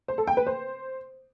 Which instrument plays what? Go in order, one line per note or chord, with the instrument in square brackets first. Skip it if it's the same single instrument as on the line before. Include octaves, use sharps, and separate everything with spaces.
[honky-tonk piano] C5
A4
G5
B4
C5